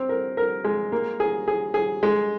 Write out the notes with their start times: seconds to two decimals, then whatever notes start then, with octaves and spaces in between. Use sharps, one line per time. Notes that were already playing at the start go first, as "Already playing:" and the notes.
Already playing: C4
0.09 A#4
0.37 A#4
0.64 G#3
0.92 A#3
1.20 G#4
1.48 G#4
1.74 G#4
2.03 G#3